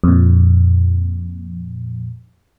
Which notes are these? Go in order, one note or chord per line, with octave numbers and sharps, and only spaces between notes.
F2 A#2